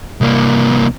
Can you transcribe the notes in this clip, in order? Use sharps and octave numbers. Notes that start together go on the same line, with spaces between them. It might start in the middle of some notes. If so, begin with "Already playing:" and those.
C2 A#3